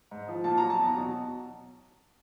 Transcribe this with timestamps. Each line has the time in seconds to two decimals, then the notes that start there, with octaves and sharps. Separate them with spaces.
0.11 G#2
0.28 F3
0.44 A#2 A5
0.58 F#3 A#5
0.70 A5
0.79 E2
0.96 B2 F#3